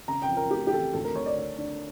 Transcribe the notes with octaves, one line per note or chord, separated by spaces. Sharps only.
C#3 A#5
G5
F2
A#4
A3 G4
G4
E3 A4
D2 A4
A#4
D3 C#5
D5
D3
D4